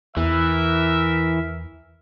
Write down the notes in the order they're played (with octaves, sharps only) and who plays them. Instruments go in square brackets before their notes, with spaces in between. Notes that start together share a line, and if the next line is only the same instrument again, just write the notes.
[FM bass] E2 [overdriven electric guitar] E3 [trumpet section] A#4 E5